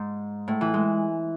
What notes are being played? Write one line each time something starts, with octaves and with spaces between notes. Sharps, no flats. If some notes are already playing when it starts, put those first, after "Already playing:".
Already playing: G#2
A2
E3
G#3